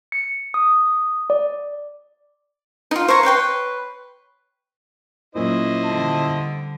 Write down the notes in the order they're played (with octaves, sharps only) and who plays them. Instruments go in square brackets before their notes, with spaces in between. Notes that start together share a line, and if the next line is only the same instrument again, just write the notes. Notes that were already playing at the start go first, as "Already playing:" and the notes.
[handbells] C#7
D#6
D5
[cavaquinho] D#4 F4
C5 C#5 A#5 C#6
B4 C#5 G5 C6
[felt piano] A#2 C#4 [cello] F#3 [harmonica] E4 C5 D#5
[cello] D3 G3 [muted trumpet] A5